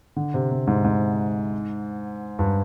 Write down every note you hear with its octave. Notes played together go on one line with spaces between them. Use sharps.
D3
C3
C3
G#2
G#2
G2